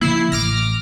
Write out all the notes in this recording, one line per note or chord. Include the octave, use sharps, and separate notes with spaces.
C#3 F3 A#3 E4 C7
A1 D6 F6 A#6